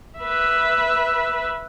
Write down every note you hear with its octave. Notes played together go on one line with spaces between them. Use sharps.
B4 E5